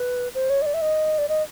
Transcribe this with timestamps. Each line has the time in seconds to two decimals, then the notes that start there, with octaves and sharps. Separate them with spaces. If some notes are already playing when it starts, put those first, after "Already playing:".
Already playing: B4
0.35 C5
0.50 C#5
0.62 D#5
0.66 D5
0.74 E5
0.82 D#5
1.18 D5
1.29 D#5